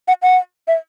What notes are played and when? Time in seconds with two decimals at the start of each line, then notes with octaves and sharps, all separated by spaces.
0.08 F#5
0.22 F#5
0.68 E5